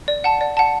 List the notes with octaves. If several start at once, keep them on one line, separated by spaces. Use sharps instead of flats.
D5
F#5 A5
D5
F#5 A5